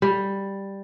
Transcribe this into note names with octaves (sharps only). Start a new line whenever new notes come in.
G3